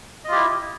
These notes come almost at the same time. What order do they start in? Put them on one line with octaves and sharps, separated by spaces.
D#5 F4 G4 E4